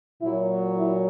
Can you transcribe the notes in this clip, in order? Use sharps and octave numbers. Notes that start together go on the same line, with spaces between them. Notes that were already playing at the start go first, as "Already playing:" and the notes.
A#2 F#3 E4
E4